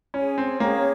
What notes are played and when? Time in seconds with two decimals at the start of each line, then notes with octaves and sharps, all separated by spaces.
0.14 C#4 G#4 C#5 G#5
0.38 C4
0.60 A#3 C#4 G#4 C#5 G5